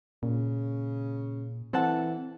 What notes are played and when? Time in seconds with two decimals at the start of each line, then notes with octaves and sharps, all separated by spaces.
0.23 A#2 C#3
1.73 E3 C4 A4 F#5 A5